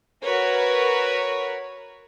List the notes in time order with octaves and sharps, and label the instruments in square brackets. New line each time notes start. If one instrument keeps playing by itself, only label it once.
[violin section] F#4 A#4 B4 C#5